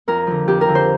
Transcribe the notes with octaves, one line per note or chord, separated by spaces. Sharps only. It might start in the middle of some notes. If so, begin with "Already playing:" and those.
F2 A#4
D3 F3
F2 G4
A#4
D3 F3
C5